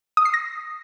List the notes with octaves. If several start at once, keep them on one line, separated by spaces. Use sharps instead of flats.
D#6
C7
A#6